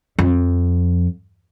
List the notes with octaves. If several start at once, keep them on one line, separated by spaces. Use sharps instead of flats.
F2